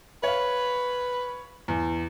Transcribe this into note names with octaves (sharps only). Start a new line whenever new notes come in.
B4 C#5 F5
E2